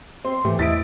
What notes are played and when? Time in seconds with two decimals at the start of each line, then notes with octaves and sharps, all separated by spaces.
0.25 C4 C6
0.45 A2 E3 A3 G4
0.59 E2 E4 D#5 A6 B6 D7